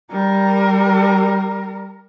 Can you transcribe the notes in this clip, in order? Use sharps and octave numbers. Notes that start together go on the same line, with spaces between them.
G3 A#4